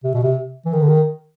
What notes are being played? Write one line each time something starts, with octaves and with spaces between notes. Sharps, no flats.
C3
B2
C3
E3
D#3
D3
D#3